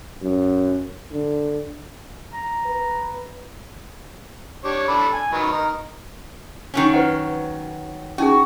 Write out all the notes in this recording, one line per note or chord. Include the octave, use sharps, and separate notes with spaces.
F#2
D3
A#5
B4
D4 G4 C#5
D4 A4 B5
G#5
D#3 F#3 B4
D#4 A#4
D#3 F#3 C#4
B4 C5 F#5
C#4 D#4 F#4 G#4